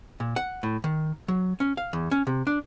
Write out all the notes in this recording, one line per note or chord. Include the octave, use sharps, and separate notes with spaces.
A#2
F#5
A2
D#3
F#3
C#4
F5
E2
C#4
C3
D4